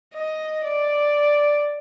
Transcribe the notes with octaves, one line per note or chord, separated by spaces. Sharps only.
D#5
D5